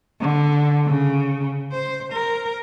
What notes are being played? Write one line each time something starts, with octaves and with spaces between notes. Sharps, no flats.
D3
C#3
C5
A#4